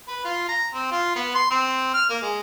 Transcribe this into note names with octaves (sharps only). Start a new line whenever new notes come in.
B4
F4
A#5
C4
F4
B3
C6
C4
F6
A#3
G#3